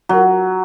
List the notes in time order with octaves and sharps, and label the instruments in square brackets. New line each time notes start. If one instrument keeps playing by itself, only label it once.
[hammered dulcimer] F#3